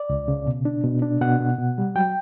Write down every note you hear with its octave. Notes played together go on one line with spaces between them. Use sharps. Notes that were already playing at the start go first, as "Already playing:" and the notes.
Already playing: D5
C#2
C#3
B2
D4
B2
D4
B2 F#5
B2
B2
G3
F#3 G5